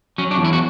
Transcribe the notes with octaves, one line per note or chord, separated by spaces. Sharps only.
F#3 C#4
D4
E2
E4
F#4